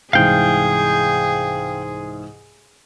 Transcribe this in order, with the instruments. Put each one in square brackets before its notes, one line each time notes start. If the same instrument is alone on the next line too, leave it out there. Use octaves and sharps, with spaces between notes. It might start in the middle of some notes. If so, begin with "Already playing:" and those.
[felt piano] C2 G#2 E3 [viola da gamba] G#4 [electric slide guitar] F5 G5